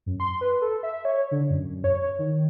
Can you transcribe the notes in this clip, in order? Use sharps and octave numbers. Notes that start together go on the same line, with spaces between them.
F#2
C6
B4
A4
E5
C#5
D3
F#2
F#2
C#5
D#3